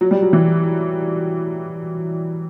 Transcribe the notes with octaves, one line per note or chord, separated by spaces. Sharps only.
F#3
G3
F#3
E3